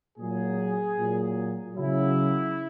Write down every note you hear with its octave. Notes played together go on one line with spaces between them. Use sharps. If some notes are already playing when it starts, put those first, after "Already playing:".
A#2 F#3 G#4
A#2 F#3
C#3 F#3 E4